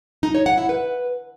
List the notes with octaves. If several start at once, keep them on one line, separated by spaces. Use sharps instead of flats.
D#4
C#5
F#5
E4
B4